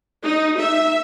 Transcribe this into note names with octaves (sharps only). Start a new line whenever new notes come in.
D#4
E5